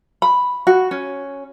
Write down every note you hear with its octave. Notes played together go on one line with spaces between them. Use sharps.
B5
F#4
C#4